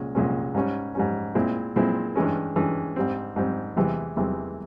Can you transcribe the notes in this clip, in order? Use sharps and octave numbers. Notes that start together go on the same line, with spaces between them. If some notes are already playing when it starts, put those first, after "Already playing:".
Already playing: C2 A#2 G#3 C#4
C2 A#2 G#3 C#4
G#2 G3 C#4
G#2 G3 C#4
A#2 G#3 C4 E4
A#2 G#3 C4 E4
G2 E3 G#3 C#4
G2 E3 G#3 C#4
G#2 G3 C4
G#2 G3 C4
E2 C3 E3 G#3 C4
E2 C3 E3 G#3 C4